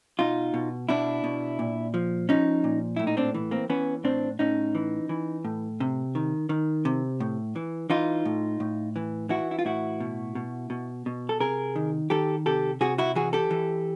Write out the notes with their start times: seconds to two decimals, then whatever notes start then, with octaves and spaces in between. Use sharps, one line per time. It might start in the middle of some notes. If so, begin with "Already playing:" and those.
0.19 B2 D#4 F4
0.54 B2
0.89 B2 D4 E4
1.24 B2
1.59 A#2
1.94 F3
2.29 F3 C#4 D#4
2.64 A#2
2.96 A2 E4
3.07 D#4
3.17 C4 D4
3.34 E3
3.51 A#3 C4
3.69 E3 B3 C#4
4.04 A2 C4 D4
4.39 A2 C#4 D#4
4.75 E3
5.09 E3
5.45 A2
5.80 C3
6.15 D#3
6.49 D#3
6.85 C3
7.20 A2
7.56 E3
7.90 E3 D#4 F4
8.25 A2
8.60 A2
8.96 E3
9.29 E3 E4 F#4
9.51 E4
9.59 F4
9.65 A2 E4 F#4
10.00 B2
10.35 B2
10.70 B2
11.06 B2
11.29 A4
11.40 C3 G#4 A#4
11.76 D#3
12.10 D#3 G4 A4
12.46 C3 G4 A4
12.81 C3 F#4 G#4
12.98 E4 F#4
13.15 E3 F#4 G#4
13.33 G4 A4
13.51 E3